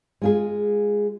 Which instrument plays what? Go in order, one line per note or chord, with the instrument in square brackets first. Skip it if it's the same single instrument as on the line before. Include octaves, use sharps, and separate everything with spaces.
[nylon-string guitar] G#3 F4 G#4